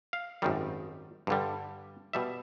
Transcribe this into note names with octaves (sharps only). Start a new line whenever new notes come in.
F5
G#1 F#2 D#3 G3
G2 D3 G3
B2 G3 E5